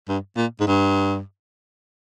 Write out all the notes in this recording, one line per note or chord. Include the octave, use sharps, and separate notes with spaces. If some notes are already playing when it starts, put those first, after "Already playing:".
G2
A#2
G#2
G2